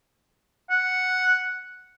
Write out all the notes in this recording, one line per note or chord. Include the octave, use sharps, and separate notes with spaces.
F#5